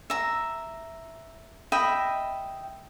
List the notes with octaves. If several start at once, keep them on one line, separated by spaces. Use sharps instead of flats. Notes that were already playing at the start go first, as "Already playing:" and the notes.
E5 A#5
D#5 E5 G5 B5